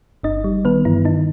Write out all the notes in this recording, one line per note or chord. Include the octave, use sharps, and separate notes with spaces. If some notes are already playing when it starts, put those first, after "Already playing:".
G1 D#4 D#5
G3
D#3 B3 B4
G2 E3 E4
D#3 D#4